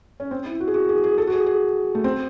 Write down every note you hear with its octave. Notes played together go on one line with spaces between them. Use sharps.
C#4
C4
E4
F#4
G#4
F#4
G#4
G#4
A4
F#4
G#4
G#4
A3
C4